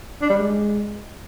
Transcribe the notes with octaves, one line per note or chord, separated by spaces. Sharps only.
D4
G3
G#3